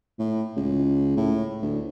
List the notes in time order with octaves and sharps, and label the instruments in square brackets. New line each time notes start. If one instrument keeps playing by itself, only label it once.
[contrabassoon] A2
C#2
A2
D2